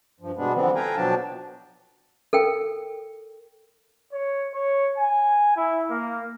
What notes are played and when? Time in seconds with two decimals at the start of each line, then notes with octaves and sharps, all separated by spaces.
0.20 G2 F3
0.37 B2 G3 G#3 B3 D4
0.54 D3 E3 F3 G3 B3 C4
0.75 A4 B4 F5 G5 G#5 A#5
0.96 B2 F3 F#3 D4 G5 A5
2.33 A4 A#4 G5
4.13 C#5
4.54 C#5
4.98 G#5
5.57 E4
5.90 A#3